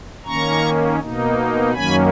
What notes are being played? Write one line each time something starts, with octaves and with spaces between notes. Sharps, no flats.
D#3 A#3 C#4 A#5 C#6
B2 A#3 D#4
F#2 D#3 F#3 A#3 C#4 G#5 B5